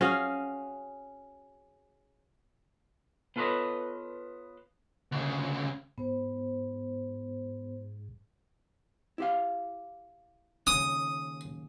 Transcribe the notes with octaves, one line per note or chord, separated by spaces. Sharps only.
C#4 F#4 G#4 F5
B3 F4 A4 B4 C#5 D#5
D2 C#3
G#2 B3 C5
E4 G4 F5
D#2 C#3 D#6